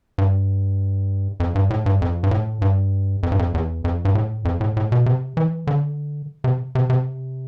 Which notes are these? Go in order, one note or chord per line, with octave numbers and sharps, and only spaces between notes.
G2
F2
G2
A2
G2
F2
G2
A2
G2
F2
G2
F2
E2
F2
G2
A2
F2
A2
A2
B2
C3
E3
D3
C3
C3
C3